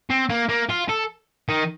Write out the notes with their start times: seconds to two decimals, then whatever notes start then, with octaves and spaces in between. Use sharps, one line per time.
0.10 C4
0.30 A#3
0.49 A#3
0.70 F4
0.89 A4
1.49 D#3